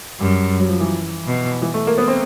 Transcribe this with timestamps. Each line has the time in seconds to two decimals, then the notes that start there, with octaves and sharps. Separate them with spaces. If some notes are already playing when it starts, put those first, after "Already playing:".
0.20 F#2 G3
0.60 F#3
0.68 F3
0.80 E3
1.27 B2
1.62 E3
1.74 A3
1.87 A#3
1.98 B3
2.08 C4